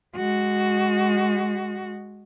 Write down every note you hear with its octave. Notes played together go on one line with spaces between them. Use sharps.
G#3 F#4